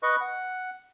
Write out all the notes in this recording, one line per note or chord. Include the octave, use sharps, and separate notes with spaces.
B4 D#5 C#6
F#5